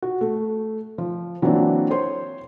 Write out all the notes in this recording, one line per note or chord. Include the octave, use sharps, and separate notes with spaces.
F#4
A3
F3
E3 F#3 A#3 C4 D4
C5 C#5 C6